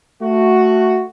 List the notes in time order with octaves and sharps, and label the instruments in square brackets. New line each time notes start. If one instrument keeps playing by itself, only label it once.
[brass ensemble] A3 F#4